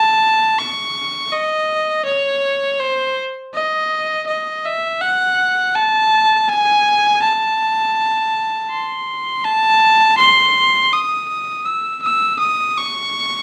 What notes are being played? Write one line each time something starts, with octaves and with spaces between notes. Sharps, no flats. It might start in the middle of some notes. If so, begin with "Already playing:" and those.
Already playing: A5
C#6
D#5
C#5
C5
D#5
D#5
E5
F#5
A5
G#5
A5
C6
A5
C6
D#6
E6
E6
D#6
C#6